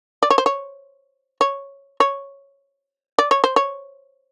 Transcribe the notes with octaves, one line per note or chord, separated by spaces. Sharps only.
D5
C#5
C5
C#5
C#5
C#5
D5
C#5
C5
C#5